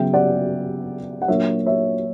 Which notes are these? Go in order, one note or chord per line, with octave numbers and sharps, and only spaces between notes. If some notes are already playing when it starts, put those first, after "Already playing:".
Already playing: C#3 F#3 B3 E5 G5
D5 F#5
F#5
A#2 F#3 A#3 D4 C#5 E5
C#5 E5